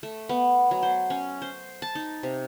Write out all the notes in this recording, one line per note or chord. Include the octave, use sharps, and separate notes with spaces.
A3
B3
F#3
C5
C#4
C5
A5
D#4
C3